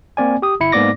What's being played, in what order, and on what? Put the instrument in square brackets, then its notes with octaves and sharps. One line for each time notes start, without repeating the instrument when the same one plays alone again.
[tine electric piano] A#3 C4 D5 G#5
G4 D#6
G1 E4 C#7
G#2 A#3 B3 D5 D6 A#6